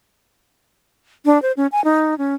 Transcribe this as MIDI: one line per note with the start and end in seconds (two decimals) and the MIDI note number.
1.25 1.41 62
1.42 1.52 72
1.57 1.67 61
1.72 1.83 80
1.84 2.17 63
2.18 2.35 61